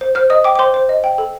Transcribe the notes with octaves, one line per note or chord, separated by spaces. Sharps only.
C5
C5 F6
D#5 D#6
G5 D6
D6
C5 C6
C5
D#5
G5
A4